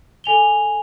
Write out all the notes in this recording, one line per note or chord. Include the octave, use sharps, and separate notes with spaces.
A4 G#5 F7 G7